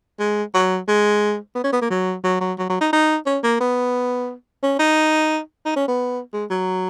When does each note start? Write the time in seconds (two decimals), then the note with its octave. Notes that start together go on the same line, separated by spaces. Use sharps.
0.19 G#3
0.54 F#3
0.88 G#3
1.55 B3
1.64 C#4
1.73 B3
1.81 A#3
1.90 F#3
2.24 F#3
2.41 F#3
2.58 F#3
2.70 F#3
2.81 D#4
2.93 D#4
3.26 C#4
3.43 A#3
3.60 B3
4.63 C#4
4.79 D#4
5.65 D#4
5.76 C#4
5.88 B3
6.33 G#3
6.50 F#3